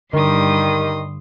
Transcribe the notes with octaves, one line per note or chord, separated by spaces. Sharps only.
G2 D3 D#3 G3 C6 D#6